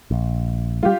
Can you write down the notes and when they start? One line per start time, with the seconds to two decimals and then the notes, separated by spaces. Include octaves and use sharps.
0.11 A#1
0.83 G3 G#3 F4 G4